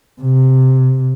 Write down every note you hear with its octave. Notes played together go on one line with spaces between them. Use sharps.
C3